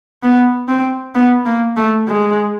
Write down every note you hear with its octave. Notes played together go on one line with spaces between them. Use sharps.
B3
C4
B3
A#3
A3
G#3